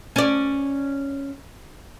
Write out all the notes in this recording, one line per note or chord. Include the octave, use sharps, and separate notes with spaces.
C#4 D5